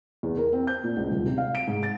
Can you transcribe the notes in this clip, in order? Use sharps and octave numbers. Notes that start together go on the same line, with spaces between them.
E2
A#4
C4
G6
A#2
C#2
D#1
C3
F5
D7
G#2
A6